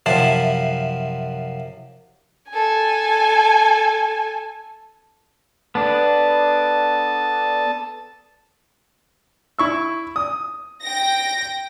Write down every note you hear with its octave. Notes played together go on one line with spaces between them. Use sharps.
F#2 C3 F3 E4 A5
A4 G#5
B3 D4 A4 A5 D#6
E4 C#6 E6
D#6
G5 A#6